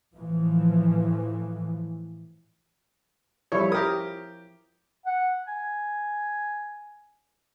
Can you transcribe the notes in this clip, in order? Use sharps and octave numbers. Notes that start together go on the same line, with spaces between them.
A2 E3 F3
F3 G3 E4 C#5
G4 A#4 D#6
F#5
G#5